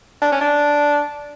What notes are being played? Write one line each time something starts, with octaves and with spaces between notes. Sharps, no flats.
D4
C#4
D4